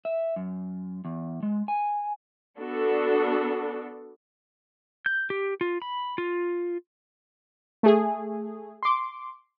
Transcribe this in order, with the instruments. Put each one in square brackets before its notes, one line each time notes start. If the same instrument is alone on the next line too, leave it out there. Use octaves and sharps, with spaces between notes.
[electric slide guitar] E5
F#2
E2
G#3
G#5
[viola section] B3 D4 F#4 A4
[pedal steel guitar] G6
G4
F4
B5
F4
[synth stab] A3 G#4
C6 D6